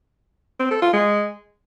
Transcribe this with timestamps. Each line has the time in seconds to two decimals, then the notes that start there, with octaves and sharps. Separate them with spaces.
0.60 C4
0.71 A4
0.82 F4
0.93 G#3